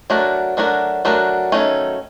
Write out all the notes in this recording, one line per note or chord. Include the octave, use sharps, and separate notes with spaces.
F#3 A3 D4 F#4 A#4
F#3 A3 D4 F#4 A#4
F#3 A3 D4 F#4 A#4
D#3 F#3 A3 C#4